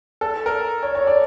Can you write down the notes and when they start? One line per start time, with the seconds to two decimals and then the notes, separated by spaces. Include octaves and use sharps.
0.21 A4
0.46 A#4
0.83 C#5
0.95 C#5
1.07 D5